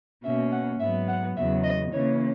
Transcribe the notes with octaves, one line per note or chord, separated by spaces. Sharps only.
B2 A#3 C#4 E5
F#5
G#2 F#3 B3 E5
F#5
E2 C#3 F#3 B3 E5
D#5
C#3 E3 A#3 C#4 C#5